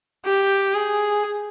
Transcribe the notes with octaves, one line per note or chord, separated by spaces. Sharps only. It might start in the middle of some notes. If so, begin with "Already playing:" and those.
G4
G#4